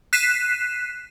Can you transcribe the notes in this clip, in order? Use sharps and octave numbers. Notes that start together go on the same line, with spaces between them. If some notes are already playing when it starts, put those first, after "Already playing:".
F#6 B6 C7 D#7 E7